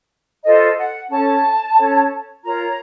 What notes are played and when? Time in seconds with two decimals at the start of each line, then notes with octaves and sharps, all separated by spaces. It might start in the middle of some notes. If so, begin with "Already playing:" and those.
0.44 F4 A4 C5 D#5
0.77 F#5
1.10 C#4 A4 C#5 A5
1.77 C#4 A4 C#5
2.43 F4 A#4 C#5 A#5